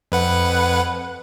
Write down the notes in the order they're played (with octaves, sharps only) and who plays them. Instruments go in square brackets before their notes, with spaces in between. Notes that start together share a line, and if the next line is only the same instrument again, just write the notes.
[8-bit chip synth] F2 B4 F#5